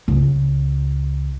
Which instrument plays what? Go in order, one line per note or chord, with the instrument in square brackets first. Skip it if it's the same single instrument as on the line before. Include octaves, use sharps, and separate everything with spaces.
[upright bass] C#2